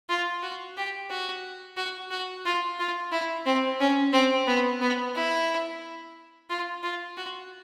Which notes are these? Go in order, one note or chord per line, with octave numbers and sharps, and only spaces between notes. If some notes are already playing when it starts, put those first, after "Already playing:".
F4
F#4
G4
F#4
F#4
F#4
F4
F4
E4
C4
C#4
C4
B3
B3
E4
F4
F4
F#4